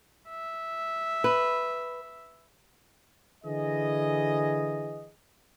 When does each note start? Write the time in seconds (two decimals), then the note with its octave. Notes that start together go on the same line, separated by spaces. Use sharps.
0.28 E5
1.24 B4
3.44 D3 E3 G#4 D#5